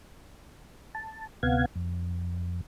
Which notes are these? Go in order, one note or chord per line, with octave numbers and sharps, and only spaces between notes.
A5
D2 C3 B3 F5 F#5 G#6
F2